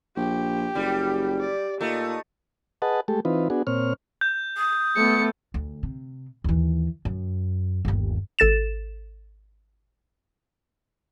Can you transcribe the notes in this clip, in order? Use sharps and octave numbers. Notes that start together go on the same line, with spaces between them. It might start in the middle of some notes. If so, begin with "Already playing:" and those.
A#1 G4
F#1 G3
D5
A#2 A3 D#4
G#4 B4 D#5 F#5 A5
G#3 A3 G4 A4
E3 C4 D#4 F4 B4
B3 D4 F#4 G#4
A#2 C4 C#5 F6
G6
D#6
A3 B3 C#7
D2
C3
D#2 E3
F#2
G1 D#2
G#1 A4 A6 E7